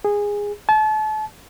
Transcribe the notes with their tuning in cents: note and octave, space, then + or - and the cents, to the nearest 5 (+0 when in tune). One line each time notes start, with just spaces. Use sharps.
G#4 -15
A5 -35